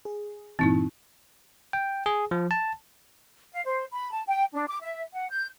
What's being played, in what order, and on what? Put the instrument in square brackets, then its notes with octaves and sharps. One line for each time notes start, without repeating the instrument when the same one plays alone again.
[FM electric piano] G#4
[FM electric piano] G2 A#2 E3 [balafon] C4 D#4 E4
[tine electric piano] G5
G#4
F3
A5
[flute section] F5
C5
B5
A5
G5
D4
D6
E5
F#5
G6